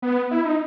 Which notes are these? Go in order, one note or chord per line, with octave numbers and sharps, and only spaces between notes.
B3
E4
D#4